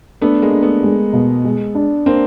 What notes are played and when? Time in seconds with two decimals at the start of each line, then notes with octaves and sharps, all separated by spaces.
0.21 A3 B3 D4
0.42 G#3 A#3
0.52 D4
0.63 A3 B3
0.83 G#3
1.13 B2
1.44 G#3
1.75 D4
2.06 A#3 C4 D4